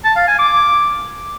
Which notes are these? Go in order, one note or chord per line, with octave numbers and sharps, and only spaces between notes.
A5
F5
G#5
D6